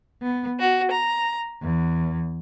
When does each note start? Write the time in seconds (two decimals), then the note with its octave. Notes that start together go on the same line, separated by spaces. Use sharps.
0.21 B3
0.59 F#4
0.92 A#5
1.61 E2